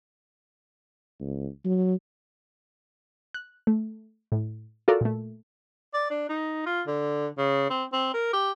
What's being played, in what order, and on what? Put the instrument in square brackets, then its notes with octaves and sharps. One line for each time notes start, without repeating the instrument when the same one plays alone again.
[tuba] C#2
F#3
[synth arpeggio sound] F#6
A3
A2
F4 F#4 A4 A#4 D5
A#2 A3
[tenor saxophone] D5
D4
D#4
F4
D3
C#3
C4
C4
A#4
G4